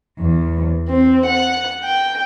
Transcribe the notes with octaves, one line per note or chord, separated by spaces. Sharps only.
E2
C4
F#5
G5